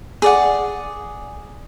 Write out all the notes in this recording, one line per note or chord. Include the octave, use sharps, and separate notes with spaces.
G#4 D5 F#5